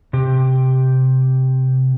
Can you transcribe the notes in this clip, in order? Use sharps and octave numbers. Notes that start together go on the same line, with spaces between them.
C3 G4